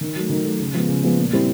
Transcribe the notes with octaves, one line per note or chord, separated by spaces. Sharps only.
D#3
F#3 A3
D#3
F#3 A3
C#3
F3 G#3 B3
C#3
F3 G#3 B3
A#2
G3 C4 E4